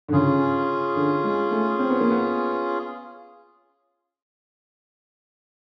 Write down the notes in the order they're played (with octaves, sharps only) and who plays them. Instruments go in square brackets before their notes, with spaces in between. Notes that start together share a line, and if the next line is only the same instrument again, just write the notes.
[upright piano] D3
[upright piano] C#3 [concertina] C#4 F4 G#4
[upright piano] D3
G#3
A3
C4
B3
A#3
B3